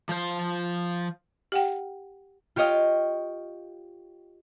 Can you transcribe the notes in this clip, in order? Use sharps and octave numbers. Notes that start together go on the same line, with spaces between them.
F3 C5
G4 F#5 G5
F4 G4 C#5 D#5 F5 G5